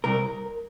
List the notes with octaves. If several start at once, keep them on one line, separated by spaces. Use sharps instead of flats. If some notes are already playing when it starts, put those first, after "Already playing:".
C2 A#4